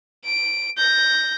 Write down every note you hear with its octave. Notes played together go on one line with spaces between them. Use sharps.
D7
G6 A#6